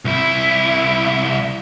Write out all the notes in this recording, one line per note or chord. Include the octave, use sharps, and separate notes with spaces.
C2 E4